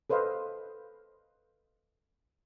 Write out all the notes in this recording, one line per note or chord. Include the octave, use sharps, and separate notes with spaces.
A4 B4 C5 D#5 F5